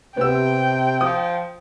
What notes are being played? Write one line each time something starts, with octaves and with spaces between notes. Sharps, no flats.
C3 B3 C4 G5 E6
F3 D#6